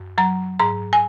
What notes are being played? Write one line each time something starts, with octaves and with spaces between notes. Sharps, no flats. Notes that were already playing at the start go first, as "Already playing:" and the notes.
Already playing: F#2
F#3 A#5
G#2 A#5
G#5